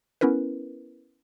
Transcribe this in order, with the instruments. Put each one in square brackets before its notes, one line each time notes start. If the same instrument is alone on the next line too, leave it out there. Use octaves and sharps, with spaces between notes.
[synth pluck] B3 C#4 E4 A#4 B4